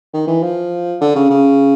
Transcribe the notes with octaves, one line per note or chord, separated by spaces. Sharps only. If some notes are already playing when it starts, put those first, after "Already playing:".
D#3
E3
F3
D3
C#3
C#3